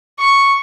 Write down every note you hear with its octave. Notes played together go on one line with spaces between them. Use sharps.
C#6